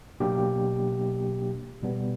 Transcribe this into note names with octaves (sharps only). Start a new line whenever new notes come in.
B2 F#3 A#3 D4 G4
B2 G3 B3